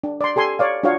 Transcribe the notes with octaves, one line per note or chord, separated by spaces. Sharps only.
D4
D5 C6
G4 A4 G#5 C6
C#5 D5 F5
D4 F4 F#4 C#5 F5